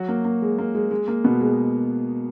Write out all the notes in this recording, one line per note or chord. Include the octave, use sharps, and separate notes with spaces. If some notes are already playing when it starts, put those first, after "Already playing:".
Already playing: F#3 F#4
A#3
A#3
G#3
A#3
G#3
G#3
A#3
B2 B3
G#3